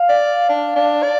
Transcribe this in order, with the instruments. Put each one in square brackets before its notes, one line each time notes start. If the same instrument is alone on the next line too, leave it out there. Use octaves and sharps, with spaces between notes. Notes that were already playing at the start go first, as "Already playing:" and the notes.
Already playing: [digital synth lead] F5
[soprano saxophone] D5
D4
D4
D5